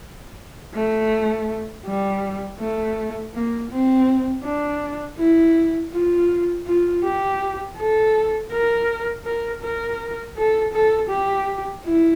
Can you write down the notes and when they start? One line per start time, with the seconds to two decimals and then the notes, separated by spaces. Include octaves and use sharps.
0.75 A3
1.86 G3
2.60 A3
3.34 A#3
3.71 C4
4.44 D4
5.18 E4
5.93 F4
6.66 F4
7.04 G4
7.77 A4
8.51 A#4
9.25 A#4
9.62 A#4
10.37 A4
10.73 A4
11.09 G4
11.85 E4